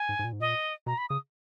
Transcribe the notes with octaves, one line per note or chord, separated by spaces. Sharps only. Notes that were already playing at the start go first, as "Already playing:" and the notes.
Already playing: G#5
G#2
G#2
A#2
G#2
A#2 D#5
B2 A#5
B5
C#3 D#6